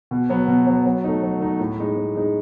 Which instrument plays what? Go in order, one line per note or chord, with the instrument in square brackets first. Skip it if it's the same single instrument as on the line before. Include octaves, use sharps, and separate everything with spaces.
[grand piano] B2
F#3 B3
B2
F#3 B3
F#3
A3 D#4
F#3
A3 D#4
A2
G#3 D#4
A2
G#3 D#4